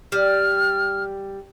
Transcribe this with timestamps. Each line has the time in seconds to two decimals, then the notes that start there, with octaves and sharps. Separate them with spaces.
0.12 G3 F6